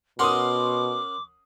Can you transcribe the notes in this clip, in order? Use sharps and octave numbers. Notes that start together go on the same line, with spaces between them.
B2 C#4 A#4 F#5 C6 D6 D#6